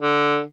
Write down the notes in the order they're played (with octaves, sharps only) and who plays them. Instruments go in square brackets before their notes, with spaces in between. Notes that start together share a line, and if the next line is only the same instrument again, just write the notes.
[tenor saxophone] D3